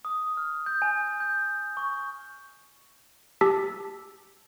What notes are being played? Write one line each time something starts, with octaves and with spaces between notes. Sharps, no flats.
D#6
F6
G6
G#5
G6
C#6
G4 A5 E6 B6